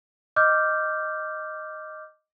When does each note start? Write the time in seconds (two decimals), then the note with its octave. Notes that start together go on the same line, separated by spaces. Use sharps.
0.36 D#5 D6 F6 G6